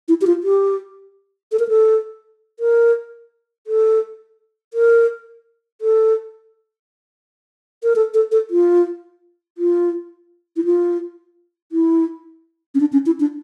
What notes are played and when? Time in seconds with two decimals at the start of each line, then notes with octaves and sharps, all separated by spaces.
0.08 E4
0.21 G4
0.27 F4
0.43 G4
1.52 A4
1.59 A#4
1.69 A4
2.60 A#4
3.67 A4
4.74 A#4
5.81 A4
7.83 A#4
7.96 A4
8.14 A4
8.32 A4
8.51 F4
9.58 F4
10.57 E4
10.65 F4
11.72 E4
12.75 C#4
12.80 D4
12.93 C#4
13.06 E4
13.20 D4